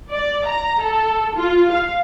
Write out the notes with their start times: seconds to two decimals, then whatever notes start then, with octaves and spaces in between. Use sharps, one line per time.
0.11 D5
0.47 A#5
0.82 A4
1.35 F4
1.72 F5